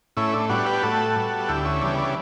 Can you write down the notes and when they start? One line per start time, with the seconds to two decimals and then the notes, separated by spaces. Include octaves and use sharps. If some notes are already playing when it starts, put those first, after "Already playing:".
0.17 A2 C#4 E4
0.33 D4
0.49 G3 B3 D4 F#4
0.66 G4 B4
0.82 A2 F#4 A4
1.16 G3 B3
1.48 D2 E4 G4
1.64 C#4 E4
1.81 C#3 E3 G3 B3 D4
1.98 D4